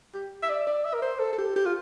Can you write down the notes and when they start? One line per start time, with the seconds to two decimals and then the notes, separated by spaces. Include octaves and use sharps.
0.14 G4
0.43 E5
0.49 D5
0.67 D5
0.85 E5
0.94 A#4
1.02 C5
1.20 A4
1.33 A4
1.38 G4
1.56 G4
1.66 F4